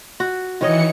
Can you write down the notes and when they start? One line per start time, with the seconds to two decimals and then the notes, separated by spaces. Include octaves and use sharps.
0.20 F#4
0.61 D#3 E3 C#5 D#5 C#7